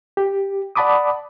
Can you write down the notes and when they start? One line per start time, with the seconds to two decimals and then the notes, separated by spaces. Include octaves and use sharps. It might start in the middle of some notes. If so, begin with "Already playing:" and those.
0.17 G4
0.76 D5 F#5 A5 B5 D6 D#6